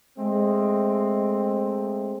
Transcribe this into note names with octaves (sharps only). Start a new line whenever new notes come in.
G#3 A3 C4